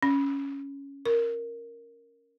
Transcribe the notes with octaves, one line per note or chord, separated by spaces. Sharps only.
C#4
A#4